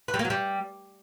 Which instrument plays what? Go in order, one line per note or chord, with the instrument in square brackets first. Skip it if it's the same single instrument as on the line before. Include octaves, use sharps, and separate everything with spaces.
[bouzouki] B4
G3
A#3
F#3
G3